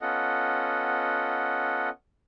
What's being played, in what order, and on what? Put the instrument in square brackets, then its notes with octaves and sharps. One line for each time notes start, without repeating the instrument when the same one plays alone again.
[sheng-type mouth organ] B3 C#4 F4 A4 D#5 F#5